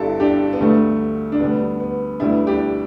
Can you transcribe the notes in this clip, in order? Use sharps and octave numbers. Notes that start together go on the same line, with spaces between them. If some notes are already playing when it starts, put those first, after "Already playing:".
Already playing: G1 G2 G3 E4 A4
D4 G4
B3
D2 D3 G3 A3
D4
D2 D3 G3 B3
B3
D2 D3 G3 B3 E4
D4 G4